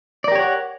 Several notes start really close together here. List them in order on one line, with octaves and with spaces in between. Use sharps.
D5 A#4 G4 C#5 F#5